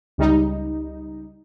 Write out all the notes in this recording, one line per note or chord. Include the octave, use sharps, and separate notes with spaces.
C#2 G3 D#4